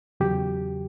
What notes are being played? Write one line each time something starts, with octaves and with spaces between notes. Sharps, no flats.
E2 C#3 F#3 G4